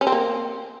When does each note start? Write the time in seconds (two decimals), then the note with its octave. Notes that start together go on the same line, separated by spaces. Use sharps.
0.01 C#4
0.07 C4
0.12 A#3